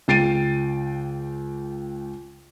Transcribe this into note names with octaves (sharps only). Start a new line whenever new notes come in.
C#2 G5 A6 C7 D7 D#7